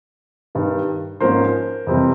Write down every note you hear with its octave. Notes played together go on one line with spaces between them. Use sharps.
G2 D#3 G3
G#2 F3 A#3 C#4 A#4 C5
F2 C3 E3 G3 C4